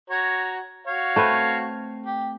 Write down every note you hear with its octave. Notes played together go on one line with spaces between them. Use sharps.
F#4 C#5 A#5
F#4 C#5 F5
A3 C4 B4
G4